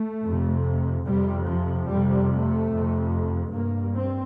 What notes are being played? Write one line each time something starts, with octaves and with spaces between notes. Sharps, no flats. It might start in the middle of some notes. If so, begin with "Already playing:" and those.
Already playing: A3
F2 C3
F2 C3 G3
F3
F2 C3 G3
A3
F2 C3
G2 A#3
C4